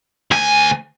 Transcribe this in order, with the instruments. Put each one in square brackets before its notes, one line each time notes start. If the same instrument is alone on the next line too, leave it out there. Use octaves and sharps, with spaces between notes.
[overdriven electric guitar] D2 G#5